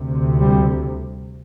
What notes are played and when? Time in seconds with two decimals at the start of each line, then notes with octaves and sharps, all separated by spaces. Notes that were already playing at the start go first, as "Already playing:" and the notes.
Already playing: D2 C3
0.40 G3